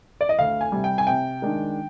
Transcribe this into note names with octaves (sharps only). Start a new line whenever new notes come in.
D5
D#5
D2 F5
G#5
C3 G3
G5
G#5
C3 G5
D#3 G#3 D4